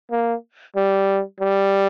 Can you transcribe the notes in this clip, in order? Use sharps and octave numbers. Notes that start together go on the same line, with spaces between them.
A#3
G3
G3